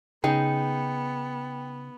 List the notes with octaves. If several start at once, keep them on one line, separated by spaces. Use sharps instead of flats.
C#3 B3 D#4 G#4 G5